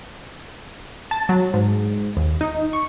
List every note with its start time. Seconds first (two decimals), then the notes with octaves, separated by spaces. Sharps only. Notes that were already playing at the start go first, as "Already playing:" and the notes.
1.11 A5
1.29 F#3
1.54 G#2
2.17 D#2
2.41 D#4
2.73 C#6